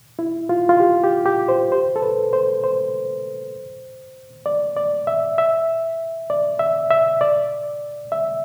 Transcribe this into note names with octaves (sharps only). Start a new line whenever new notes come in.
E4
F4
F4
G4
G4
G4
C5
C5
A4
B4
C5
C5
D5
D5
E5
E5
D5
E5
E5
D5
E5